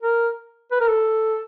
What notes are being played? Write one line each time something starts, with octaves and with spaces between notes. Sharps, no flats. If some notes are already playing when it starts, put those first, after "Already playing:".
A#4
B4
A#4
A4